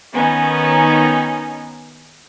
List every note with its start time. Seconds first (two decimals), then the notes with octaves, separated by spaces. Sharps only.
0.14 D#3 B3 C#4 D#4